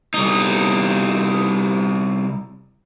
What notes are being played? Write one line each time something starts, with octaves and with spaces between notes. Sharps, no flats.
C2 D#4